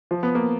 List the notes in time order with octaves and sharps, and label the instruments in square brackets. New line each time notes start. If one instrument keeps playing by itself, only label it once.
[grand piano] F3
B3
A#3